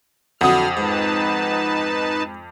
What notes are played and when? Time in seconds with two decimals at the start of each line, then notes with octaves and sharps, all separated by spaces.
0.41 F2 D3 F#3 E4 F#5 D#6 F6
0.77 G#2 D#4 B4 A5